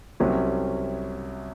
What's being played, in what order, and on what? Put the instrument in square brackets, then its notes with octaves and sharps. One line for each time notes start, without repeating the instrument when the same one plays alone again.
[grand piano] C2 C3 F#3 C#4